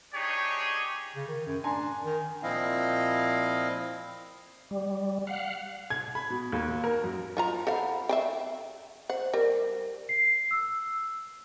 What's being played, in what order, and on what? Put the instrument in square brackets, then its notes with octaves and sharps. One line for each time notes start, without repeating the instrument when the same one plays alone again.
[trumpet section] D4 D#4 G4 G#4 C#5 G#5
[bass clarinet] C#3
D#3
F#2
[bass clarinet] D4 [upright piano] G#5 A#5 C6
[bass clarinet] D#3
[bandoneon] A#2 F3 C4 E4 D#5 F5
[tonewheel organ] G3
F5 F#5
[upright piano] G#6
B5
B2
D#2
A#4
F#2
[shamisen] F3 F4 A#5
[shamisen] A4 C5 F5 [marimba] F#5 A#5 B5
[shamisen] E5 F5 G5
[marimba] C5 [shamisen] F#5
[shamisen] G3 [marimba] A#4
[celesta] C7
E6